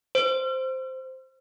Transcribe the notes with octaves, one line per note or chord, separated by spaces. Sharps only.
C5